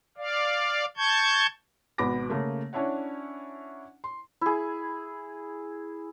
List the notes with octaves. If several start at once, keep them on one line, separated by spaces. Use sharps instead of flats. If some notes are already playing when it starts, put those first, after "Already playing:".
D5 F5
A5 C#6 G6 G#6
G#1 B2 B3 B5 D6 A#6
C#3 A3 A#3
C#4 D4 E4 C#5 F#5
C6
E4 G#4